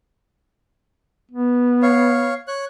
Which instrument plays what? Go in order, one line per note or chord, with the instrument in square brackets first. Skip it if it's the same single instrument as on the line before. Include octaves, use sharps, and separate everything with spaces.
[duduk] B3
[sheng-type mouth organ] C#5 F5
C#5 F#6